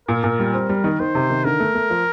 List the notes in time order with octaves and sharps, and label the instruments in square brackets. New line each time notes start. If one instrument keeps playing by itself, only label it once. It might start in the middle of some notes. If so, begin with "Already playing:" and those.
[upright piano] A#2 [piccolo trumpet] A#4
[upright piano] A#2
G3
C4
G3
D#3
[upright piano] D#3 [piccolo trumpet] C5
[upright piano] C3
D#3
[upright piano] D3 [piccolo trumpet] A#4
[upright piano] A3
A3
F3